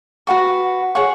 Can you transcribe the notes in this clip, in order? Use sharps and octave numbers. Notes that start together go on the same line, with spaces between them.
F#4 B4 F#5 C#6
G#4 C#5 F#5 C#6